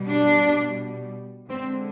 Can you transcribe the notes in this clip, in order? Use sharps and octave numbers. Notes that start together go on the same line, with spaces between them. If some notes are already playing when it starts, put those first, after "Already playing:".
Already playing: B2 G3
D4
D3 G#3 C4